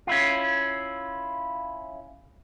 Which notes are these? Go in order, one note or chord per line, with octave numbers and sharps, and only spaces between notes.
C#4 E4 F4